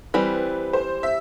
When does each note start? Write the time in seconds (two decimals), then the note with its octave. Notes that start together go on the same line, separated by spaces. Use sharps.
0.14 E3 G3 C4 B4
0.73 C5
1.03 E5